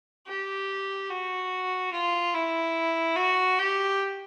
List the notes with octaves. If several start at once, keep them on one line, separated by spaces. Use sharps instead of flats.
G4
F#4
F4
E4
F#4
G4